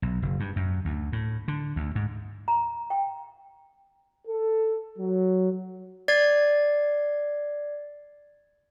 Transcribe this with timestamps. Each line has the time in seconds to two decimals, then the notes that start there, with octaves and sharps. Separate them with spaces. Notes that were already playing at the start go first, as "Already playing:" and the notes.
0.02 B1
0.22 F#1
0.40 G2
0.56 F#2
0.85 D2
1.13 A2
1.48 D3
1.76 D2
1.95 G#2
2.48 A#5
2.90 G5
4.27 A4
4.99 F#3
6.08 D5 G#6 C7